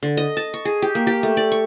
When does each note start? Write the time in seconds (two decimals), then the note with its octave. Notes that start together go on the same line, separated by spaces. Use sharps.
0.03 D3
0.17 D#5
0.37 A5
0.54 C#6
0.65 G#4
0.82 G4
0.95 A#3
1.07 G4
1.23 A3
1.37 D5
1.52 C#6